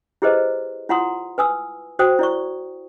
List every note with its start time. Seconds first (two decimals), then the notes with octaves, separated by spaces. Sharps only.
0.22 E4 G4 G#4 B4 C5 D#5
0.89 E4 F4 F#5 A#5 C6 D#6
1.38 B4 G#5 D#6 E6
1.99 F#4 C5 G5 D#6
2.19 E4 D5 C#6